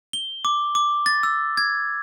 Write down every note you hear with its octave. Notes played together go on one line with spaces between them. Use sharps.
G7
D6
D6
A6
E6
G#6